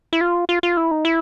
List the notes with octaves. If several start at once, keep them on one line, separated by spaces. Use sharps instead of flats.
E4
F4
F4
F4
E4
D#4
E4